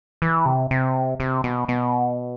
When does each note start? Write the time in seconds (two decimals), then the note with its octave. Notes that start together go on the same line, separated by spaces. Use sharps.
0.22 E3
0.46 C3
0.71 C3
1.20 C3
1.44 B2
1.68 B2